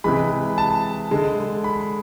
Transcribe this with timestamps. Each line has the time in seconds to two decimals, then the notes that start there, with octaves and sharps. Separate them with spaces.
0.04 C3 E3 G#3 B5
0.58 A5
1.11 D3 G#3
1.64 B5